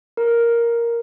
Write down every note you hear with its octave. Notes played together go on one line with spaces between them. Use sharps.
A#4